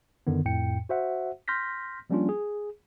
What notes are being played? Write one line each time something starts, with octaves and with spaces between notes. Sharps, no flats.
F#2 D3 D#3 B3
F2 A2 G5 C#7
F#4 C5 E5 F#5
C6 F6 G6 A#6 B6
F3 G3 A#3 C#4 D4 F4
G#4